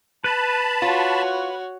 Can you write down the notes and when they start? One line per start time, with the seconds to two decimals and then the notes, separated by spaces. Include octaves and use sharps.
0.24 B4 A5 B5
0.82 F4 F#4 C#5